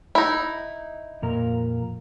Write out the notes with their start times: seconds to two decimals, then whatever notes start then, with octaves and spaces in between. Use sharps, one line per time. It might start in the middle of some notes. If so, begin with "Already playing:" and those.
0.15 D#4 E4
1.22 F2 A#2 A#4